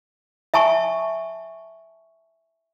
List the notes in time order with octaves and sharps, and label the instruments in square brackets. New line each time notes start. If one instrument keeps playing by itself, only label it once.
[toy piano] E5 G#5 A5 C#6